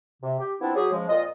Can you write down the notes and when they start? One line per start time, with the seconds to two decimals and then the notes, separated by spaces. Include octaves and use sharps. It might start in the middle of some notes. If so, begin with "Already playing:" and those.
0.23 C3
0.39 G4
0.61 F3 B3 C4 D4 E4 F4
0.76 F#3 G4 G#4
0.92 C#3 F3 G#3
1.09 F2 A#2 F4 D#5